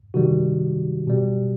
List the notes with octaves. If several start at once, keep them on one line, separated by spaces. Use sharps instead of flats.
C3 D#3 G3 F#4
B2 G3